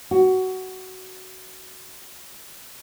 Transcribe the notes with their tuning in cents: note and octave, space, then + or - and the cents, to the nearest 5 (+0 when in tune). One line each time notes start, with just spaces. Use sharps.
F#4 +15